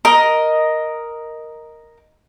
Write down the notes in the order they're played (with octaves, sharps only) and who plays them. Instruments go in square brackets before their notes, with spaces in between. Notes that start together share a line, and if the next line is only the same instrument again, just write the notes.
[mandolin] A#4 D#5